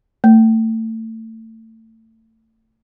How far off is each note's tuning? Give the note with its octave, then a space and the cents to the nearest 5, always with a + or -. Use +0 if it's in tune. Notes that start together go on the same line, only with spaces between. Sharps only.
A3 +25